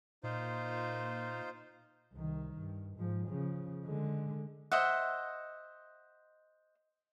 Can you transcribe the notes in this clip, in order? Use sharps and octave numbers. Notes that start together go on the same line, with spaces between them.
A#2 D#4 F4 C5
C2 D#3
G2
G#2 F3
C#3 F3
D3 G#3
C5 D#5 E5 F#5